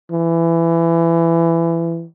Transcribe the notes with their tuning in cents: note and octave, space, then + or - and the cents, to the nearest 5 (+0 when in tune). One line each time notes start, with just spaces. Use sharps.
E3 +20